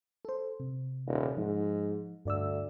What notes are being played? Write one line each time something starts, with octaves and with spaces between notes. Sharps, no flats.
A4 C5
C3
D#1
G#2 F3
D2 G2 D5 E6